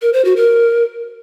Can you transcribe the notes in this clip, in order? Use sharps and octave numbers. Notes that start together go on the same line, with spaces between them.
A#4
C5
F#4
A#4